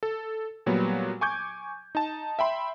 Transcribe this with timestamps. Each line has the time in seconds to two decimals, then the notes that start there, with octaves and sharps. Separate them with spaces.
0.03 A4
0.66 A#2 F#3 G3 B3
1.21 G#5 C#6 D6 G6 G#6
1.95 D#4 A5
2.39 E5 G5 B5 C6